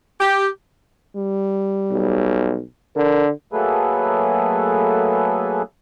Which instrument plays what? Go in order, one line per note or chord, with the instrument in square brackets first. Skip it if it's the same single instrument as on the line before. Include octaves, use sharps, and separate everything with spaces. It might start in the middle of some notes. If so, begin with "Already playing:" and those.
[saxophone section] G4
[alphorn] G3
[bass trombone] B1
[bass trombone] D3 [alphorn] A#4
[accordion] F#3 A3 A#3 G#4 A4 B4